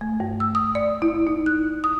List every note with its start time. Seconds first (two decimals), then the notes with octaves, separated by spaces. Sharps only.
0.01 A3
0.20 G2
0.40 E6
0.55 D#6
0.75 D5
1.02 E4
1.27 D#4
1.46 F#6
1.84 D#6